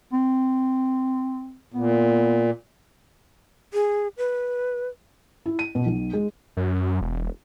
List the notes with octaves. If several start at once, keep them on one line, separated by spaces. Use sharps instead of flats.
C4
A#2 B3
G#4
B4
E4
D#7
B2
B1
G#3
F#2
E1